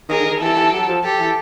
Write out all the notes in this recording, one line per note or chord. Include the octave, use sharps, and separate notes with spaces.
D#3 G#4 A#4
D3
D#3
E3 G4 A4
E3
F#3
F3
G4 A4
E3